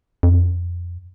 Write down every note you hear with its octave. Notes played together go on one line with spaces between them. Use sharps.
F2